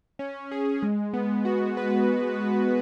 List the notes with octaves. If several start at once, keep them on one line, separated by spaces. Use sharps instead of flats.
C#4
G#4
G#3
B3
F#4
B4